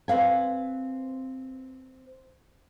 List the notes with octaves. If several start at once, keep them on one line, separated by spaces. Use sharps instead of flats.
C4 B4 F5 G#5